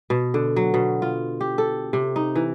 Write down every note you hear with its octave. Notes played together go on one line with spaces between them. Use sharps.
B2
D3
F#3
B2
F4
G4
A4
C3
D#4
E3